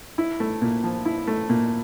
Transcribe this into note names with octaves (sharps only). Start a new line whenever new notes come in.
E4
A3
A#2
F3
E4
A3
A#2